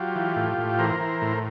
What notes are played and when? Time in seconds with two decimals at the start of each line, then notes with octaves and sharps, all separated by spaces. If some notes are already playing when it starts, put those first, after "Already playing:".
Already playing: F#3 F4 G4
0.16 E3
0.36 A2
0.58 A2
0.79 E3 A#4 C5
1.00 E3
1.22 A2